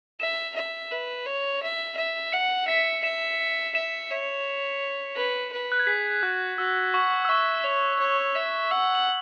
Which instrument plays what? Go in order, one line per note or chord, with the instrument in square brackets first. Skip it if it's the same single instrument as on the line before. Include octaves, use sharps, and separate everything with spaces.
[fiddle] E5 [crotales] E7
[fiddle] E5
B4
C#5
E5
E5
[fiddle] F#5 [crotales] C#7
[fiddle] E5 [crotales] B6
[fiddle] E5 [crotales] E7
[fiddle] E5 [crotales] E7
[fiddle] C#5
B4
B4
[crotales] F#6
G#6
[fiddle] G#4 [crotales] B6
[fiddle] F#4 [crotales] F#6
[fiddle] F#4 [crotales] E6
[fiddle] F#5 [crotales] C#6
[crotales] E6
[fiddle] E5 [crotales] C#6
[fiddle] C#5
C#5
E5
[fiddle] F#5 [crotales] E6
[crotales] F#7